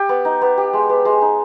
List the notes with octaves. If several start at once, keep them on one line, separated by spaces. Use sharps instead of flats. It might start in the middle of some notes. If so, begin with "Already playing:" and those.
Already playing: G4
B3
D#4
B3
G4
G#3
B3
G#3
D#4